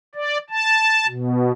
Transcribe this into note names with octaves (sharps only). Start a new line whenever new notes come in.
D5
A5
B2